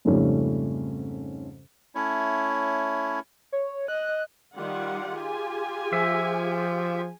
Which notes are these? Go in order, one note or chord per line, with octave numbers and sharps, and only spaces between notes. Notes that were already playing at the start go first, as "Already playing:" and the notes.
F2 G#2 C#3 G3 A3 C#4
A3 C#4 E4 C#5
C#5
D#5 F#6
D#3 G3 F4 G4 F#5
G#4 G#5
F3 E5